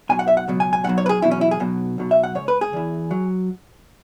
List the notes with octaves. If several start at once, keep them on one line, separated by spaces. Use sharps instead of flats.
B1 B2 F#3 G#5
F#5
E5
F#5
C#2 B2 F#3
G#5
G#5
B1 B2 F#3 F#5
C#5
B4
G#4
E2 B2 F#3 E4
C#4
E4
G#4
B1 B2 F#3
B1 B2 F#3
E5
F#5
C#2 C#3 C#5
B4
G#4
E2 E3
F#3